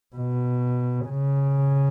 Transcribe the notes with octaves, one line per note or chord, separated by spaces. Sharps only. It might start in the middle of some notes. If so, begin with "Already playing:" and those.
B2
C#3